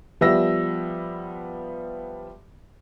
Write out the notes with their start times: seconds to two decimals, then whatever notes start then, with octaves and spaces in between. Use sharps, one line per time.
0.21 F3 G3 B3 E5 E6 A#6